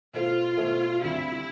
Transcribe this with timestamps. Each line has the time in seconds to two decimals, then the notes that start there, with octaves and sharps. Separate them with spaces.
0.14 B2 A3 E4 F4 A4 C5
0.57 B2 A3 E4 A4 C5
1.01 D2 C3 G3 E4